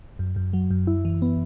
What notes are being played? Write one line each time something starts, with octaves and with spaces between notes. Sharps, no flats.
F#2
F#2
F#3
F#2
E4
E3
B3